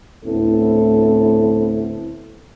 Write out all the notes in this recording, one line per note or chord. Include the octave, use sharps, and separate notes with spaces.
D2 A2 B3 C4 E4 A4